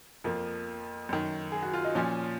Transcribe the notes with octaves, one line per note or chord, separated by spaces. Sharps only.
F2 F3 A#3
F#2 D#3
G#4
F#4
F4
D#4
A#2 F3 C#4